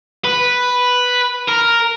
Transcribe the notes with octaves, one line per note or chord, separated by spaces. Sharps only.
B4
A#4